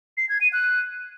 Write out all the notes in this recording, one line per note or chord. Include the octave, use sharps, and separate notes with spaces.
C7
G#6
D#7
F#6